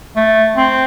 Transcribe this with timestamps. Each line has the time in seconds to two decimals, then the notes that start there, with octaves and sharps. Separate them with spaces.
0.16 A3
0.57 C4